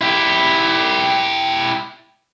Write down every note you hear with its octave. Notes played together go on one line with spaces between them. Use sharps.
E4 G4